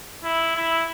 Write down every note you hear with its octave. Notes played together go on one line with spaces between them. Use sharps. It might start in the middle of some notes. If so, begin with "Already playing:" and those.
E4
E4